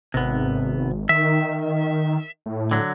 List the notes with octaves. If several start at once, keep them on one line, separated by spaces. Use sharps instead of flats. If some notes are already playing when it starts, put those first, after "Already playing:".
G#1 C3 B3
D#3 E5
A2
D3 F#3